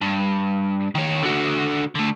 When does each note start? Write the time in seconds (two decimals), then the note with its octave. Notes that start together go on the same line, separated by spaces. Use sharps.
0.02 G2
0.95 D#3 C#5
1.23 D3 F#4
1.95 D3 A3